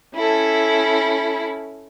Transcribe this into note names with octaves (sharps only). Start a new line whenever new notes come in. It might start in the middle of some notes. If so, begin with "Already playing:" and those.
C#4 E4 A4